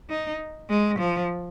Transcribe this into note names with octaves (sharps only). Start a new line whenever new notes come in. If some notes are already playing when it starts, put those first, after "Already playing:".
D#4
G#3
F3